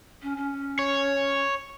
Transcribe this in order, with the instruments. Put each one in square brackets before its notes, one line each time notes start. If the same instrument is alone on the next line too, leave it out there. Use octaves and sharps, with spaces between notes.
[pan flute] C#4
C#4
[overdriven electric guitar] C#5